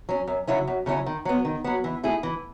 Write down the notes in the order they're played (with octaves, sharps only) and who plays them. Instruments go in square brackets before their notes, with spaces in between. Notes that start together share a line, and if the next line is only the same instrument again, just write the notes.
[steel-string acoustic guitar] F#3 C#4
F#2
C#3 F#3 C#4 E4
F#2
C#3 F#3 C#4 E4
D#3
F#3 B3
D#3
F#3 B3
E3
A3 E4 G#4
E3